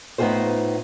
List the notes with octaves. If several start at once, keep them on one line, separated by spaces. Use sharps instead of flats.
A2 B3 D#4 F4 G#4 C5